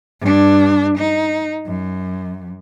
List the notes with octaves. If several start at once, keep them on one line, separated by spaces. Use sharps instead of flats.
G2 D4
D#4
F#2